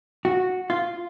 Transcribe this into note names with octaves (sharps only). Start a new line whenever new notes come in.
F#4
F4